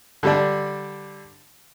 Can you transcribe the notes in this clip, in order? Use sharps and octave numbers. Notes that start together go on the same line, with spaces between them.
D3 G3 D4